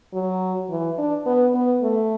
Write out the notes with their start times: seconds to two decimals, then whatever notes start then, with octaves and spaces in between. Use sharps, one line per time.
0.13 F#3
0.70 E3
0.98 D4
1.26 B3
1.54 B3
1.82 A3